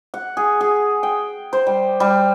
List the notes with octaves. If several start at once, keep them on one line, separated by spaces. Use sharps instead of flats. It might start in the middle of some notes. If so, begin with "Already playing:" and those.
F#5
G#4
G#4
G5
C5
G3
G3